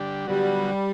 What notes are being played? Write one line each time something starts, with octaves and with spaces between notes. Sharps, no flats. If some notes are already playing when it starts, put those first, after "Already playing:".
Already playing: D3 G3 D4 G4
D3 F#3 G3 B3 F#4